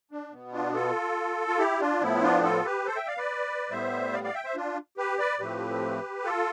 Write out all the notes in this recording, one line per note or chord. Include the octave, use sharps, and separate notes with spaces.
D4
B2 B3
D4 F4
F4 A4
F4
E4 G4
D4 F4
A2 F3 B3 E4
D4 F4
F4 A4
G4 B4
A4 C5
E5 G5
D5 F5
B4 D5
A2 G3 B3 C5 E5
D5 F5
D5 F5
E5 G5
C5 E5
D4 F4
G4 B4
B4 D5
A2 F3 A3 C4 G4 B4
F4 A4